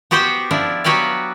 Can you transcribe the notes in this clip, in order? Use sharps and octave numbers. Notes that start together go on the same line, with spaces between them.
B3 F#4 G4 C5 F#5 G5
F3 D4 E4
F#3 B3 F#4 G4 B4 F5